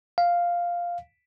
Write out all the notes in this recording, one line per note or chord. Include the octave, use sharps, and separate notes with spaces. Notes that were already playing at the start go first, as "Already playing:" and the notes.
F5